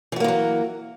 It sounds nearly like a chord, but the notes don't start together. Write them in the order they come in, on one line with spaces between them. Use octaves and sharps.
E3 F#4 A#3 G#3 F#3